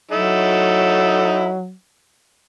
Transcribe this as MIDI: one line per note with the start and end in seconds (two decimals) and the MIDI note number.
0.11 1.73 54
0.11 1.54 63
0.11 1.54 64
0.11 1.54 69